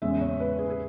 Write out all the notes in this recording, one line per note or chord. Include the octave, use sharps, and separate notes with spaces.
E2 C#3 G#3 C#4 E5
C#5
B4
G#4
G#4